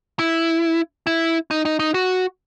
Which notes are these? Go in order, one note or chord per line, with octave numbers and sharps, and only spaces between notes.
E4
E4
D#4
D#4
D#4
F#4